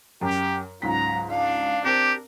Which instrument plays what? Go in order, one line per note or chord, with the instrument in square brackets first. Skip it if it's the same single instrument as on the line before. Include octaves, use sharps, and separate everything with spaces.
[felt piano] F#2 [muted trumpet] G4
[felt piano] C#2 G#2 B6 [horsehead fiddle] F#3 [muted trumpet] A#5
[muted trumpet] D4 [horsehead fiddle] F5
[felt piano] C4 [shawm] G4 [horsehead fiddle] A#4